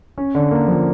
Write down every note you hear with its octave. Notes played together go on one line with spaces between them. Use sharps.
C#4
D3
A#3
F3